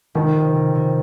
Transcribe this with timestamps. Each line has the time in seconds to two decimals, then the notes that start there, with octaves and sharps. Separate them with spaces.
0.15 F1 D#3
0.35 C3
0.55 F1
0.75 C3